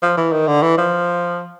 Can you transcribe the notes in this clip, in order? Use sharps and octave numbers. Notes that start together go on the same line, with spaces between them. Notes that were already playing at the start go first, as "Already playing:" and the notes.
F3
E3
D#3
D3
E3
F3